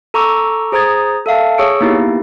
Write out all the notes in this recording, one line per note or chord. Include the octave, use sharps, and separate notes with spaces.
A4 A#5 C#6 D6 E6
G#4 C5 A#5 D#6 G#6 A6
A4 E5 F5 A5
G#4 C#5 C#6 E6 C#7 D7
A#3 B3 D#4 E4 G4